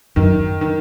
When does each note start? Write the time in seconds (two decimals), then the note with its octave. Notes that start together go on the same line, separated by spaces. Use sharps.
0.16 F#2 D#3
0.61 D#3